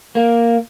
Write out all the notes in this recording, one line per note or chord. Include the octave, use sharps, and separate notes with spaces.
A#3